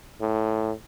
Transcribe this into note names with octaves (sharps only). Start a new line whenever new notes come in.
A2